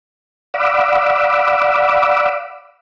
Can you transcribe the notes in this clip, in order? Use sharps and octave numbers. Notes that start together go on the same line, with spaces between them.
D5 F5 F#5 B5 D6 E6